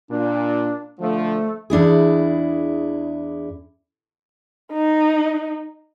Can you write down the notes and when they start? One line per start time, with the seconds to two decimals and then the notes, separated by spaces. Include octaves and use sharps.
0.11 A#2 D4
0.99 D3 F3 A3
1.70 E2 D4 E4 G#4
4.72 D#4